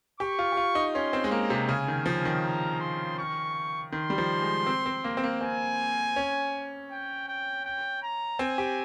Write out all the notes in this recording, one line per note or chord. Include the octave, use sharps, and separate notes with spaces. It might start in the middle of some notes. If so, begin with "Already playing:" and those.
G4 C#6
F4
G4
F4
D#4
C#4 C6
C4
G#3
A#3 A#5
C3
C#3 G#5
D#3
F3
D#3
A#5
C6
C#6
D#3 C6
G3
F3
G#3
C4
C4
A#3
C4
A#3
C4 G#5
C#4
G5
G5
G5
A#5
C4 G#5
G4